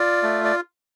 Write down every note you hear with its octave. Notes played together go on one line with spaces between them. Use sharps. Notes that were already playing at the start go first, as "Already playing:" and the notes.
Already playing: F4 D5
A3
D5